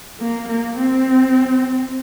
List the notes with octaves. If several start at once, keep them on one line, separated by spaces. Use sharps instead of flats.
A#3
A#3
C4